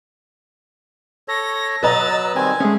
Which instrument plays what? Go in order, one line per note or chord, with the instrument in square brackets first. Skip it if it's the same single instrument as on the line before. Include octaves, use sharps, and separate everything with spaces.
[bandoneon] A4 C#5 [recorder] A#6
[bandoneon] F#3 E6 F#6 [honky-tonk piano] B4 D#5 A#5 [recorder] A6
[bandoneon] D#3 G3 C4 [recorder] G#5
[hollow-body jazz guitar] G#3 C#4 [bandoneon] A3 G#4